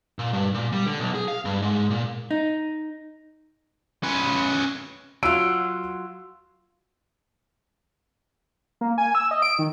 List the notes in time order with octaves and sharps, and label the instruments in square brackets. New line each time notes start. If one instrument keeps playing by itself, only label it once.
[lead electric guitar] A#2
G2
A#2
G3
D3
B1
G#4
F5
G2
G#2
A#2
[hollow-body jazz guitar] D#4
[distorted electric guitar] C#4 B4
[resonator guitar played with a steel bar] F#3 F4 [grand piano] E6 D7
[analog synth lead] A#3
G#5
E6
D#5
D7
D#3